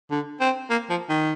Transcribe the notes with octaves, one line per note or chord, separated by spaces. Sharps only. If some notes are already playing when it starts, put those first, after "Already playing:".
D3
C4
A#3
F3
D#3